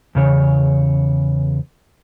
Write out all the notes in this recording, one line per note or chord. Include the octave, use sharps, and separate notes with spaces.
E2 C#3 C#5